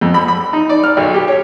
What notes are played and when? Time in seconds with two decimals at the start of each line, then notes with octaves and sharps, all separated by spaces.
0.01 F2
0.14 B5
0.28 B5
0.53 D#4
0.69 D5
0.84 F6
0.97 B1
1.14 G4
1.28 C#5